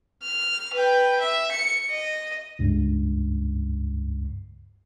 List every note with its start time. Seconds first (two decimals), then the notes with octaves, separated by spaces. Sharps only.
0.22 F6
0.73 B4 G5
1.20 E5
1.51 C#7
1.90 D#5
2.59 C#2 G2